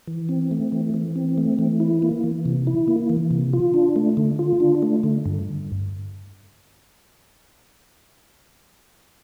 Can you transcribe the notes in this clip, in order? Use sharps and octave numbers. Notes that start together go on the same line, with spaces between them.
E3
C4
A3
E3
E3
C4
A3
E3
E4
A#3
E3
C3
E4
A#3
E3
C3
F4
D4
A3
D3
F4
D4
A3
D3
G2